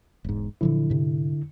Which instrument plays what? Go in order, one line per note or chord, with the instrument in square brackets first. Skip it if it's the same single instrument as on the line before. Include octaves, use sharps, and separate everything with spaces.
[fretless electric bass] E1 G#2
[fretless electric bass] A#2 F3 F#3 [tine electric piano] D3 E4
[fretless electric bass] G#2 C3